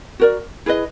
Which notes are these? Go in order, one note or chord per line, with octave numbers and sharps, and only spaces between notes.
F#4 A#4 D5
E4 G#4 B4 D#5